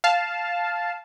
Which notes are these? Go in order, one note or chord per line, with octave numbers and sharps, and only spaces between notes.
F5 A5